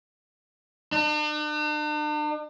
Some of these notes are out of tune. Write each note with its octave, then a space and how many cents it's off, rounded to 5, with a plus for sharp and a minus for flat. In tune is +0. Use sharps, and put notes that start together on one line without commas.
D4 +45